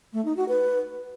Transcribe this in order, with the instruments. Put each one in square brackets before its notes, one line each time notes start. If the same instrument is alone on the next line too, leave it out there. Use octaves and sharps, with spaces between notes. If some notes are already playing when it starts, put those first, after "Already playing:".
[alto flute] A3
D#4
F#4
B4